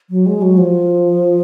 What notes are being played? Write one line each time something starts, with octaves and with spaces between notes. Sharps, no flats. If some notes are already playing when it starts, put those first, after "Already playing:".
F#3
G#3
F#3
F3